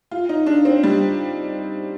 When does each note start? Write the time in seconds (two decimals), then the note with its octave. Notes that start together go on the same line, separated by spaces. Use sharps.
0.11 F4
0.29 D#4
0.46 D4
0.65 C4
0.84 G3